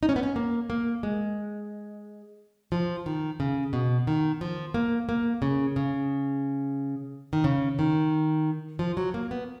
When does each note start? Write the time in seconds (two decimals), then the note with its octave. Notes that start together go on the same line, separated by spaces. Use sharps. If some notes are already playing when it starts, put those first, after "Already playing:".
0.03 D#4
0.09 C#4
0.16 B3
0.23 C#4
0.36 A#3
0.70 A#3
1.03 G#3
2.72 F3
3.06 D#3
3.40 C#3
3.73 B2
4.07 D#3
4.41 F3
4.74 A#3
5.09 A#3
5.42 C#3
5.76 C#3
7.33 D#3
7.44 C#3
7.79 D#3
8.79 F3
8.97 F#3
9.14 A#3
9.31 B3